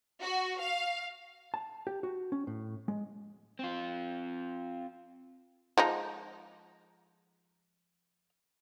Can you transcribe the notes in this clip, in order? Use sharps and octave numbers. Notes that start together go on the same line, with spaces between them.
F#4
F5
A5
G4
F#4
C#4
A2
G#3
C4 F4
F3 G#3 D#4